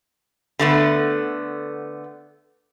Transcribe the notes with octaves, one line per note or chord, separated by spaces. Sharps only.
D3 A3 B3